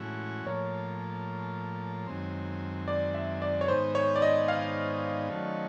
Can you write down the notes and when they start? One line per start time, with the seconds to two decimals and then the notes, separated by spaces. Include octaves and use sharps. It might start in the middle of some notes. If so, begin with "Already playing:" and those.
Already playing: A2 E3 G#3 C#4 F#4
0.46 A2 F3 A#3 C#5
2.07 F#2 D#3 G#3 C4
2.88 D5
3.14 E5
3.42 D5
3.61 C#5
3.68 G#2 D#3 G#3 B3 D#4 C5
3.95 C#5
4.16 D5
4.22 D#5
4.48 F5
5.29 D#3 F#3 A3 C#4